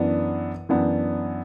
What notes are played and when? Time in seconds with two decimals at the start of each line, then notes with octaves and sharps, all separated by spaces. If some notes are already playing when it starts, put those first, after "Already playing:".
Already playing: F#2 E3 B3 D4
0.69 F#2 E3 B3 D4